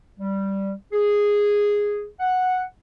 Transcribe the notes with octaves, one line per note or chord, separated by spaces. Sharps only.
G3
G#4
F#5